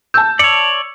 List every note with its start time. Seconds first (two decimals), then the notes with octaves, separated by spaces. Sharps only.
0.14 A5 E6 G6
0.39 C#5 D5 C#7